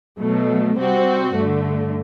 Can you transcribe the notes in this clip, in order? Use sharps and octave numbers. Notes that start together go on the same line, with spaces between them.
B2 F#3 A3
C3 G3 C4 F#4
G2 D3 A3